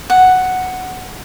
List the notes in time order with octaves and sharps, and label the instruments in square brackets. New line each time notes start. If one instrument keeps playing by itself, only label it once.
[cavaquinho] F#5